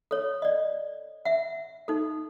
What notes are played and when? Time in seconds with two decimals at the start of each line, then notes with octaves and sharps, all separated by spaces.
0.11 A4 C#5
0.42 D5 D#5
1.25 E5 F#5
1.88 D#4 A4